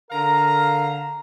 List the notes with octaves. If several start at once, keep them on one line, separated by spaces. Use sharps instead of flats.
D3 A#4 F5 A#5